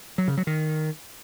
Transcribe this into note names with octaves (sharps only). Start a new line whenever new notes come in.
F#3
C#3
F#3
D#3